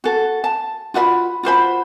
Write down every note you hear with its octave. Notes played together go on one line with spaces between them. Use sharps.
F#4 A4
A5
F4 F#4 D#5 B5
F4 F#4 C5 B5